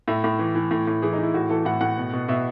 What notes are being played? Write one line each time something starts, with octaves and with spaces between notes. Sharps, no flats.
A2 E5
A2
E3
E3
A2
A2
E3 G#4
D#4
E3 E4
A2 F#4
E3 A4
A2 F#5
A2 F#5
B2
B2
B2 E5